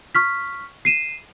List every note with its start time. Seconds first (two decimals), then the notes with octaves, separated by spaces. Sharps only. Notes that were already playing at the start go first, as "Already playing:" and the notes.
0.15 C#6 F6 B6
0.85 C7 D#7 E7